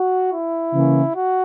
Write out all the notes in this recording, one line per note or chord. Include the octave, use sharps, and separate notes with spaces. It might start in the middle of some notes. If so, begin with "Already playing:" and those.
Already playing: F#4
E4
C#3 E3 A#3 C#4
F#4